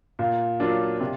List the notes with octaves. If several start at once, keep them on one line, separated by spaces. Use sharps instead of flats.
A#2
F#3 A#3 D4 F4
C3